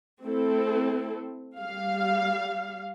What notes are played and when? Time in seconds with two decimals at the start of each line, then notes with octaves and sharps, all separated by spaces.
0.23 A3 C4 E4 A4
1.60 G3 F5